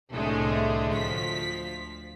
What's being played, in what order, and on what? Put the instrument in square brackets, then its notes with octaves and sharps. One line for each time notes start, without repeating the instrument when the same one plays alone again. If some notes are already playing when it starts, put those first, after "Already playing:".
[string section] C2 A2 D3 G#3 A3
D2 F3 B6